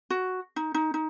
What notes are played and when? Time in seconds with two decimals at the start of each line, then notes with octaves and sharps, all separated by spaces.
0.10 F#4
0.56 D#4
0.74 D#4
0.94 D#4